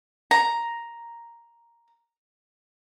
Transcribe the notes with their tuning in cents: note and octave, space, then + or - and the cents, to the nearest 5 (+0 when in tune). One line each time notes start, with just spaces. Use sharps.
A#5 +5